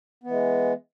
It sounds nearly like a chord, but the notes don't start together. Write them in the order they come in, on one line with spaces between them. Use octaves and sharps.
B3 E3 G#3